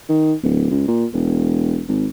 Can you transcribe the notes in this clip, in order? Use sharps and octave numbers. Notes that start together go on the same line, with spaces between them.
D#3
D1
C#2
A#2
E1
G#1